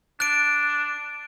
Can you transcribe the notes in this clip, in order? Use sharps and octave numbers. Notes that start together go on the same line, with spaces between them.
D4 F#6 D7